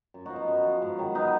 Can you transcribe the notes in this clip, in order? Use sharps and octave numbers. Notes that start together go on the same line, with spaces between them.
F#2
F3 D#4 F#4
B3 D#4
F#2
F3
G#2
D#3 F#3
B3 D#4